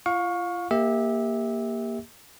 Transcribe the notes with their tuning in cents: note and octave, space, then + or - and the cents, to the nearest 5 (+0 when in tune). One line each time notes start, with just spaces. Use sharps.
F4 -35 F5 +30 C#6 +0
A#3 +0 G4 +25 E5 -20